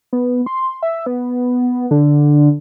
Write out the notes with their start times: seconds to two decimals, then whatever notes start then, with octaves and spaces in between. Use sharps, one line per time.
0.13 B3
0.46 C6
0.83 E5
1.06 B3
1.91 D3